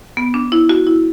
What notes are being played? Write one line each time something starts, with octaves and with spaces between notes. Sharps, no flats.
B3
D4
E4
F#4
E4